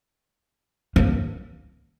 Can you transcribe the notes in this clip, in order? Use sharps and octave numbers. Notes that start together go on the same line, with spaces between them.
A#3